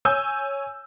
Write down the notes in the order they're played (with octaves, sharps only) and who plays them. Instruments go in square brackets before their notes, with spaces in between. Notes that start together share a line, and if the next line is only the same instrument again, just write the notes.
[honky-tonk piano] C#5 G#5 E6 G6